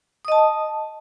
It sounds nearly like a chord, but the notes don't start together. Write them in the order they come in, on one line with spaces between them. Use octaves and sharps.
D#6 D#5 A5